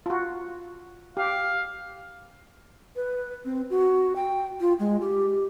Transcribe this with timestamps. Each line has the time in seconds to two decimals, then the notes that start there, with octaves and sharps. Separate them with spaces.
0.06 F4 F#4
1.17 G4 F5
2.96 B4
3.45 C4
3.70 F#4
4.16 G5
4.61 F4
4.79 G#3
5.01 G4